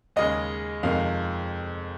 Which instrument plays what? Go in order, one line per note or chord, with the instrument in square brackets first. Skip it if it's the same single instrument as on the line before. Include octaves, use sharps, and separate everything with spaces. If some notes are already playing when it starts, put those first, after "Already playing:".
[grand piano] D#2 C#3 G#3 D#5
F2 C3 D#3 G#3 F5